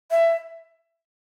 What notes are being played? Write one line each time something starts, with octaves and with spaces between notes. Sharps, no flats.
E5